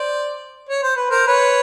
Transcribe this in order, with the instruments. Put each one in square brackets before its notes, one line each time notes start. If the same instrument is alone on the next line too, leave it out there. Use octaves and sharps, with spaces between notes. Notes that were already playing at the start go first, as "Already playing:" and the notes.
Already playing: [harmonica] C5 D5
C#5
C5
B4
A#4 C5
B4 C#5